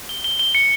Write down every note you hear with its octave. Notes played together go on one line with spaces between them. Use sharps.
G7
G7
G7
C#7